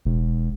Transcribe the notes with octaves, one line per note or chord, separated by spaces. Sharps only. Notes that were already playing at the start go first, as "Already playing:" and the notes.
E1